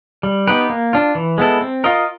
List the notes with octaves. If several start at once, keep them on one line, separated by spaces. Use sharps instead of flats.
G3
B3 D#4 G4 B4
A#3
D4 F4
E3
G#3 B3 E4 A4
C4
F4 A#4 D#5